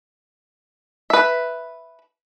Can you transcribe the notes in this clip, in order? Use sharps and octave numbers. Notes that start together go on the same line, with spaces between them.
B4 E5